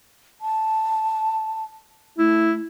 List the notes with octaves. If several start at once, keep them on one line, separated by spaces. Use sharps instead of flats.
A5
A3 E4